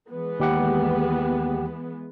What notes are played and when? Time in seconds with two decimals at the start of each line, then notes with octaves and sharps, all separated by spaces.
0.10 E3 G#3 B3
0.40 D#2 G4 F#5